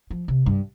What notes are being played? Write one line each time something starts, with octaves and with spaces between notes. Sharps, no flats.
F3
C3
G2